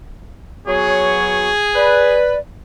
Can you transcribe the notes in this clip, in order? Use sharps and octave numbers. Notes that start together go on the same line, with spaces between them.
F#3 B3 G#4 C#5
B4 D5